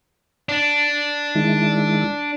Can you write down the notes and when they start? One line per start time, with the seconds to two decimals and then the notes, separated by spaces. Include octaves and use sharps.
0.49 D4
1.35 D#3 G#3 E4